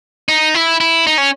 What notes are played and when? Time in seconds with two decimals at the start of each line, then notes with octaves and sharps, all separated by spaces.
0.29 D#4
0.54 E4
0.80 E4
1.07 D#4
1.18 C#4